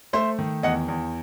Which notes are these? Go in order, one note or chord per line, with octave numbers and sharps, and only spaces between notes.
A3 C5 E5
D#3
E2 D#5 F#5
E2